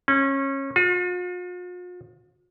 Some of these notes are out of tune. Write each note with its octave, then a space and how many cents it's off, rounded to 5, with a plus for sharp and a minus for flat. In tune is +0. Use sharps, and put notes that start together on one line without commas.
C#4 -25
F4 +45